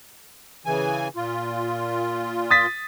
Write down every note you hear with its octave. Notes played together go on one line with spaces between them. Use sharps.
C#3 E3 G#5
A#2 F4
D#6 A6 B6